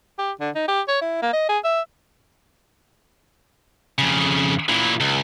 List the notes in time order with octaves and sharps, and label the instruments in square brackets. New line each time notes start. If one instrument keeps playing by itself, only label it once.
[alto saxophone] G4
D3
D#4
G4
C#5
E4
A#3
D#5
G#4
E5
[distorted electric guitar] F2 C#3
A#2 E3
C#2